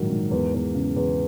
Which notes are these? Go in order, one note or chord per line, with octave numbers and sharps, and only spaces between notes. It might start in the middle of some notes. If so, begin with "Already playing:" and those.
Already playing: A#1 G#2 D#3 F#3 A#4
G#2
E2
E2
C#3
E2